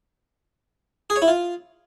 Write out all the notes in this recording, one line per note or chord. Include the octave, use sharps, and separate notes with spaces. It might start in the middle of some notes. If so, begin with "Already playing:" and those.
G#4
C#5
E4
F4